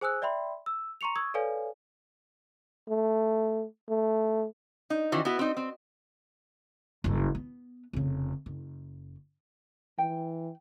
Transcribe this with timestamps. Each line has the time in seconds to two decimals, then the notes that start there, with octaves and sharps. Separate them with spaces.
0.01 G#4 C5 G#5 D#6 E6 F#6
0.22 D5 E5 G5 B5 C6
0.66 E6
1.01 A#5 C6 C#6 C#7 F7
1.16 C#6 D#6 E6 G#6
1.34 A4 B4 C#5 D5 F5 G#5
2.89 A3
3.89 A3
4.90 D#4
5.12 D#3 E3 C#4 F#4
5.25 B3 E4 F#4 B4
5.39 C4 D#4
5.57 C4
7.04 F#1 G2
7.35 B3
7.93 F1 C#3
8.46 F#1
9.98 E3 G5